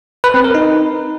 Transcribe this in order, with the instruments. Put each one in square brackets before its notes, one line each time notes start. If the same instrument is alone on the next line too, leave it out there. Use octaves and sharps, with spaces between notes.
[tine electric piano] B4
C4
A#4
D#4